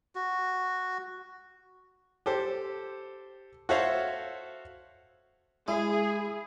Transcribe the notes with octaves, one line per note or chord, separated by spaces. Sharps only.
F#4
G4 A4 C5
F#4 A4 C5 C#5 E5 F5
G#3 E4 G#4